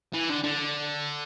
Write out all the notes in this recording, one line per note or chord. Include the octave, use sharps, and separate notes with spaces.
E3
D3
D3